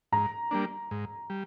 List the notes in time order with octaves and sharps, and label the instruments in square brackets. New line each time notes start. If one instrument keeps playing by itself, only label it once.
[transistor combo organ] G#2 [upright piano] A#5
[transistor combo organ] G3 A#3 D4
G#2
G3